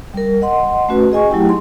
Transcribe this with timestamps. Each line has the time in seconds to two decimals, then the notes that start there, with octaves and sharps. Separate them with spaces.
0.14 G3 A#4
0.42 D#5 F#5 C6
0.89 A3 C#4 F#4 B4
1.12 G#4 D#5 G#5 C#6
1.30 F#3 A3 E4 G4 G5
1.46 D#4 C6